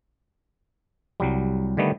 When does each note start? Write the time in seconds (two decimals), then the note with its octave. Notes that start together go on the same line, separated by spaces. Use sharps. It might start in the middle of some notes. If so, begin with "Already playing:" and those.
1.20 C2 F#3 G3
1.77 D3 D#3 G3 A3 B3